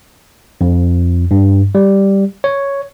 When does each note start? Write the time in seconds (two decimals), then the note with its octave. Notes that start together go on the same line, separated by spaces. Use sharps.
0.61 F2
1.31 G2
1.75 G3
2.44 C#5